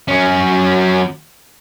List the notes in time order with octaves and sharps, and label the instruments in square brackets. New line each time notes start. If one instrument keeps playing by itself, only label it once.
[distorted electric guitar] F#3 C#4